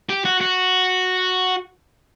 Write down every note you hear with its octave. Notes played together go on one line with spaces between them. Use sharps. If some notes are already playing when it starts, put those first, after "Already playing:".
G4
F#4
F#4